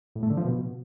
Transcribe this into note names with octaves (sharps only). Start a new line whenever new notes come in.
A2
A3
D3
F3
B2